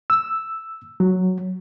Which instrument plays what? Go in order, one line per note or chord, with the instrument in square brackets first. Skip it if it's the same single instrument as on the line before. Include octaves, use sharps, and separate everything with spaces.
[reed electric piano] E6
F#3